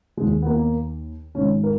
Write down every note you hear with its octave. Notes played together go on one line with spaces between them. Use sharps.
D#2 D#3 G#3
B3
A#3
G#1 G#2 D#3 C#4
A#4